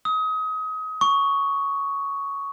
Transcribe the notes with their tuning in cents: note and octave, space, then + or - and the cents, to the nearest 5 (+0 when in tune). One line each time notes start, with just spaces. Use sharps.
D#6 +30
C#6 +5